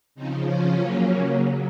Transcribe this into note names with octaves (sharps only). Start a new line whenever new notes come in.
C#3 F3 C4 D#4
C#4 F4
C#3 F#3 A#3 C#4
C#3 F#3